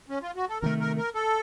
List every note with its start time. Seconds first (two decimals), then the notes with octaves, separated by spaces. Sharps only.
0.09 C#4
0.22 F4
0.36 F#4
0.49 A4
0.62 C3 D#3 A3 A#4
0.80 A#4
0.97 A#4
1.15 A4